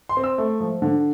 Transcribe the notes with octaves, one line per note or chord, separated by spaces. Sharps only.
C6
C4
E6
A3
F3
D3